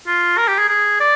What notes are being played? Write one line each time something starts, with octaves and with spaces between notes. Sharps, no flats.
F4
A#4
G4
G#4
G#4
D5